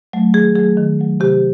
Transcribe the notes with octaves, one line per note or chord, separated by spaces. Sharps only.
F#3 A3
D#3 G#4
F#3 A3 G#4
D#3
F#3 A3
C3 G4